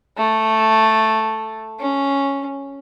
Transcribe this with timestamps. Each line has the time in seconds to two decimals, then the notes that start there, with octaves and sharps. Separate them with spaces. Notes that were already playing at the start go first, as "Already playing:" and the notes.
0.17 A3
1.80 C#4